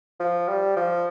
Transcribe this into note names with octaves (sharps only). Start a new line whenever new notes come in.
F3
G3
F3